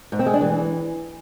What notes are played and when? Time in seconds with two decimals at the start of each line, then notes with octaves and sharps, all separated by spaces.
0.12 G#2
0.19 C4
0.26 G#3
0.34 D4
0.41 E3